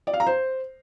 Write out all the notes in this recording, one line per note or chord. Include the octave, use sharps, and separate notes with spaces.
D5
F5
A#5
C5